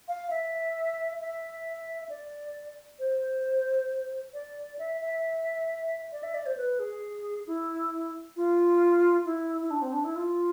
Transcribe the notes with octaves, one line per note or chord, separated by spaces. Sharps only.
F5
E5
E5
D5
C5
D5
E5
E5
D5
E5
D5
C5
B4
G#4
E4
F4
E4
E4
D4
C4
D4
E4
F4